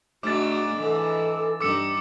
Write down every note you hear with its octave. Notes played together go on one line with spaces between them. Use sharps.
G#2 A3 D4 F#4 D6 A6
E3 A4
G2 D#4 D6 E6 C#7